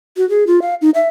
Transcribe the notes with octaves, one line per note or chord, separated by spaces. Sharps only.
F#4
G#4
F4
F5
D#4
E5